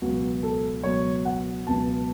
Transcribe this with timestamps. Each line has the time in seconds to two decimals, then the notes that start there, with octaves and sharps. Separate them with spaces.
0.02 C#2 B2 F#3 F#4
0.43 A4
0.84 C#2 B2 F#3 C#5
1.25 F#5
1.66 C#2 B2 F#3 A5